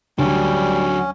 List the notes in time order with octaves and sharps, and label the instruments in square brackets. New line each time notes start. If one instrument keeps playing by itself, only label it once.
[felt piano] D2 [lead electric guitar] F#3 D4 [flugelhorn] G3 [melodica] C#4